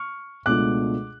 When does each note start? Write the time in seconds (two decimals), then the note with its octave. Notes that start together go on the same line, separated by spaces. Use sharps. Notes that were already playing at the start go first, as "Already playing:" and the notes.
Already playing: C#6 F6
0.46 C#2 B2 A3 D4 F4 D6 F#6